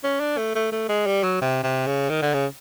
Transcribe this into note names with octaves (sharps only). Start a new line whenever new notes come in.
C#4
D4
A3
A3
A3
G#3
G3
F#3
C3
C3
C#3
D#3
D3
C#3